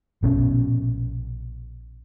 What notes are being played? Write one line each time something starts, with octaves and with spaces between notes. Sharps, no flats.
A#1 B2 C#4